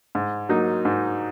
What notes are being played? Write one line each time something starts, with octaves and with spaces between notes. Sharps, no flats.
G#2
F#3 A#3 D#4
G#2